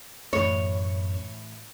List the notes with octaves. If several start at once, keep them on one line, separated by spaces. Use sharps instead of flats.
F#2 A2 E3 C#5